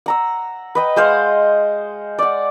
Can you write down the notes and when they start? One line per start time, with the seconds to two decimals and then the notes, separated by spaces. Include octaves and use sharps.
0.06 F#5 A#5 E6
0.75 B4 D#5 G5
0.96 G#3 C5 F5 F#5
2.18 D5 F#5